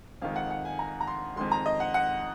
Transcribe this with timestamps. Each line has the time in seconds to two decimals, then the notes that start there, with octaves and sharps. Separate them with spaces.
0.22 F2 D#3 G#3 F5
0.36 F#5
0.51 F#5
0.65 G#5
0.79 A#5
1.01 A#5
1.07 C6
1.36 F2 D#3 G#3 C6
1.51 A#5
1.66 D#5
1.80 F#5
1.94 F#5